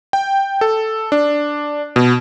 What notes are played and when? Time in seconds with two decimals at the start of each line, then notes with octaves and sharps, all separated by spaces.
0.13 G5
0.61 A4
1.12 D4
1.96 B2